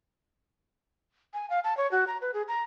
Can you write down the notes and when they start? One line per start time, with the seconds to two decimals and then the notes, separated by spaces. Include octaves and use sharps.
1.34 G#5
1.50 F5
1.64 A5
1.77 C#5
1.91 F#4
2.07 A#5
2.21 B4
2.34 G#4
2.48 A#5